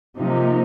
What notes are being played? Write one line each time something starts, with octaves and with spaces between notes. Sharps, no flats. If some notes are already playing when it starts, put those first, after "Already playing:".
C3 F3 A#3 D#4